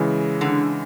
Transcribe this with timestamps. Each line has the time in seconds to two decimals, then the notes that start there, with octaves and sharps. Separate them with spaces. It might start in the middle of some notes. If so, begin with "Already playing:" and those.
Already playing: C#3 E3 G#3
0.41 D3